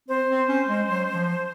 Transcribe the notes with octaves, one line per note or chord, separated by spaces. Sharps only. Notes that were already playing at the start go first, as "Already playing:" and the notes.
C4 C5
C4
C#4
G#3
F#3
F3